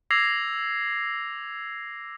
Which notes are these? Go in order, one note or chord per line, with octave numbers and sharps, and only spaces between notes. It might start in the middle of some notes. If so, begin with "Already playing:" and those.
D6 E6 G#6 A#6 C7 F7